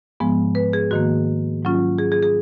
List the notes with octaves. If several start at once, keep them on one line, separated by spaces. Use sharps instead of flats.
G#2 F3 G#3 B3
B4
G#4
G#2 D#3 A#3 F#4
G#2 F#3 C#4 F4
G#4
G#4
G#4